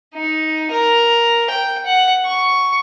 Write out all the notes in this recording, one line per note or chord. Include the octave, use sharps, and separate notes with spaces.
D#4
A#4
G5
F#5
C#6